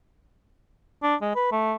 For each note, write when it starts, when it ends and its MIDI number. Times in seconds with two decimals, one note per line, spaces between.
1.03 1.15 62
1.22 1.33 56
1.35 1.51 71
1.52 1.74 57